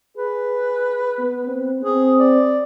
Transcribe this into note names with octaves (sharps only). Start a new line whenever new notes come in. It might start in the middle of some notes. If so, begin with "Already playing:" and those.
G#4 B4
B3
C4
C4 G#4
D5